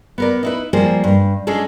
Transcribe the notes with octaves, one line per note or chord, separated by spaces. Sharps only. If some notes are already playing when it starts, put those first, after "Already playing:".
B3 A#4 D5
D#4 E4 B4
F3 G3 A#3 G#4 C5
G2
G#3 C#4 D4 G#4 A4